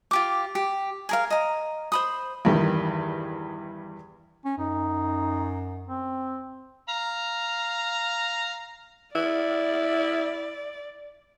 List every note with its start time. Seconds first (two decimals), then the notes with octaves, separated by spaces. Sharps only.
0.11 F4 G4 D6
0.55 G4
1.09 G#4 A#4 F5
1.30 D#5 A#5
1.92 C5 B5 D#6
2.45 E2 G2 D#3
4.45 C#4
4.58 F#2 D#4
5.88 C4
6.89 F5 A#5
9.15 E4 D5